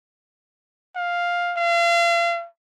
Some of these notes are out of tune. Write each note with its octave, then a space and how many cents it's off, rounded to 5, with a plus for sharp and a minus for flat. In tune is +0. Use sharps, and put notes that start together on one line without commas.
F5 +5
F5 -35